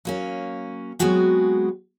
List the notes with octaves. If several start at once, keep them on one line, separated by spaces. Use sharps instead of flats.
F#3 A#3 C#4
F#3 G#3 B3 C4 F#4 G#4